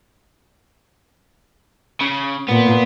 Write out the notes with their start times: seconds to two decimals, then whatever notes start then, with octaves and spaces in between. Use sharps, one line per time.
2.01 C#3
2.48 A#2 B3